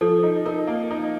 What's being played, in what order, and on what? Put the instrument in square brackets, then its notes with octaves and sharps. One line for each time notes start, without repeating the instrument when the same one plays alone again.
[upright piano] F3 [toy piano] A4
[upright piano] D#4
[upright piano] D#4 [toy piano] A#4
[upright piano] A#3
D#4